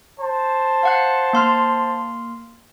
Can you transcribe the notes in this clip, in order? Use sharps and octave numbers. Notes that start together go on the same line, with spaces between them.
C5 A5
F5 F#5 F#6
A#3 C6 F6